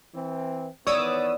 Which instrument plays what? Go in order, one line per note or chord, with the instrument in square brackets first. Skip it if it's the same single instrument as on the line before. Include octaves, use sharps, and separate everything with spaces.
[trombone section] E3 C4
[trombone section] D#3 E3 B3 [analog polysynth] C#5 D#6 E6 [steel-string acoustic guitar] D5